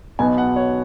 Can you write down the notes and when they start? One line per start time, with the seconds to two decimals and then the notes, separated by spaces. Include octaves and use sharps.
0.19 B1 B2 B3 G#5
0.38 F#5
0.56 C#5